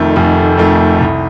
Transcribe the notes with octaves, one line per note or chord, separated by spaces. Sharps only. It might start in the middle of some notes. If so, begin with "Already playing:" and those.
Already playing: F1 F2 D#3 A3
F1
F2 D#3 A3
C2